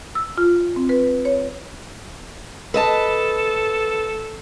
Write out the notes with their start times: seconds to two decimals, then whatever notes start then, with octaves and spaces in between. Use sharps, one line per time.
0.15 E6
0.38 F4
0.76 C4
0.89 B4
1.25 C#5
2.74 A4 B4 D#5 A5